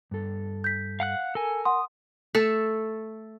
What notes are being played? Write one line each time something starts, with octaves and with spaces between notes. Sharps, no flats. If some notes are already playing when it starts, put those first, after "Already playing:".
G2 A4
G6 B6
F5 F#5 F#6
A4 A#4 G#5
F#5 G#5 C6 D#6
A3 A4